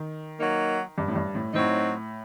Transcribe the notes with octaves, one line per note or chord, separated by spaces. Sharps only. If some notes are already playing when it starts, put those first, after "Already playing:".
Already playing: D#3
F#3 A#3 D#4
G2
A2
G2
A2
A2 F#3 C4 D#4